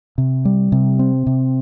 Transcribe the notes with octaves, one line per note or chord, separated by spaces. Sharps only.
C3
G3
C3
C4
C3